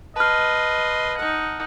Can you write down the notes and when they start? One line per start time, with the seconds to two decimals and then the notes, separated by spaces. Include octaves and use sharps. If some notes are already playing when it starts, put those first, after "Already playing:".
0.16 B4 D#5 A5 C6 F6
1.17 D#4 F#5